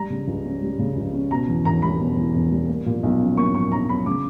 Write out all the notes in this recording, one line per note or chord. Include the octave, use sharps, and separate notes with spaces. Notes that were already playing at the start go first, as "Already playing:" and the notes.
Already playing: G3 A#5
C#3
C#2
C#4
G3
C#3
C#2
C#4
B2 A#5
E2
E1 A#5
G3 B5
B2
E2
E1
G3
A#3
A#2
B1
C#4
A#3 C#6
A#2 C#6
B1 A#5
C#4 B5
C#3 D6